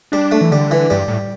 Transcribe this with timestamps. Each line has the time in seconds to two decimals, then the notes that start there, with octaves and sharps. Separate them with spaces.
0.12 G3 D4
0.32 A3
0.41 E3
0.51 D3 G3
0.71 E3
0.90 G2 G3
1.08 A2